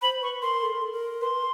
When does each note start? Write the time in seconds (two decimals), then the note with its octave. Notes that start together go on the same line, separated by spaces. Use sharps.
0.02 C5 B5
0.22 B4 C#6
0.42 A#4 C6
0.63 A4
0.72 A#4
0.82 A4
0.92 A#4
1.21 B4 C6